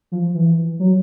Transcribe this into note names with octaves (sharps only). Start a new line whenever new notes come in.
F3
E3
F#3